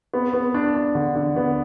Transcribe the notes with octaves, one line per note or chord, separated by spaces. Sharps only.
B3
B3
D4
D4
D3
D3
B3